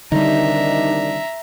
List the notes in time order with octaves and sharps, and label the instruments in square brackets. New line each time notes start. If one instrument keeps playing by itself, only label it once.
[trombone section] C2 D#3 D4 [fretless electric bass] D3 G3 [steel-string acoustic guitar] D#4 [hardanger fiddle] E5 A#5